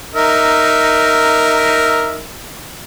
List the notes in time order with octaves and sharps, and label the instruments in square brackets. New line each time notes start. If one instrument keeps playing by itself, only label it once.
[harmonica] D#4 A#4 E5